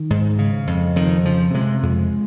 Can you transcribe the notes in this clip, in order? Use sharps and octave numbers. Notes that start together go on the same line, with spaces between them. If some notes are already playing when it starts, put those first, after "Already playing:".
Already playing: D#3
G#2
C#3
F2
F2 D#3
C#3 F3
C3 G#3
F2 G#3